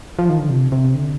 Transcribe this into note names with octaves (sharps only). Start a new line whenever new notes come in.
F3
D#3
D3
C3
C3
D3